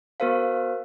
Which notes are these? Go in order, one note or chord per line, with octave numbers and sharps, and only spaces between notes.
B3 F#4 A#4 C5 F5